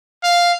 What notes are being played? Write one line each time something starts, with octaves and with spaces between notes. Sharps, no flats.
F5